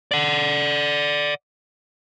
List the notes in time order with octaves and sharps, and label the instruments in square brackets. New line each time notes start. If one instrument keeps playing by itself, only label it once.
[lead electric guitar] D5 F#5